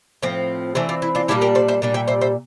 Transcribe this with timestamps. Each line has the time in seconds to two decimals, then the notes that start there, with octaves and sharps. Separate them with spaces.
0.22 A2 F3 C4
0.75 E3 A3 C4 D4
0.89 D4 F4
1.02 E4
1.15 D4 F4
1.28 A#2 G3 A#3 D4 E4 G4
1.41 G4 A#4
1.55 A4 C5
1.68 C5 E5
1.82 A#2 G3 D4
1.94 E5 G5
2.08 C5 E5
2.21 C5 E5